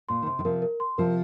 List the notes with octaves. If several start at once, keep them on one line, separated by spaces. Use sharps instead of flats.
A#2 C6
D#3
C3 C6
D#3
C3 F3 A#4
A#4
C6
C3 F3 A#4